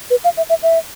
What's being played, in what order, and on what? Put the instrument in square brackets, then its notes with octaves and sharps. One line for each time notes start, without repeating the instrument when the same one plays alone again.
[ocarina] B4
F5
E5
E5
E5